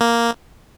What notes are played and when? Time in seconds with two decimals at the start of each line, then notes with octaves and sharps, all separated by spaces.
0.01 A#3